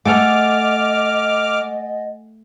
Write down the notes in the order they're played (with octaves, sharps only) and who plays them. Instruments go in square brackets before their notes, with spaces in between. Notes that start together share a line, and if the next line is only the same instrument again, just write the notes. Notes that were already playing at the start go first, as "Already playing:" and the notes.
[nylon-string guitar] A3 [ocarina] D#5 [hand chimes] F#5 G#5 A6 [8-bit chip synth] D6 F6